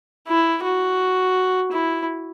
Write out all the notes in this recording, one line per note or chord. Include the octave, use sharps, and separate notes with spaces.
E4
F#4
E4